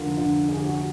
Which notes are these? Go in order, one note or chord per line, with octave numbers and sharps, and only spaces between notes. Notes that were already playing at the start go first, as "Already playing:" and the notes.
Already playing: F1 D3 F4 A#4
D3 F4
D3 G#4
G4
F#4
G4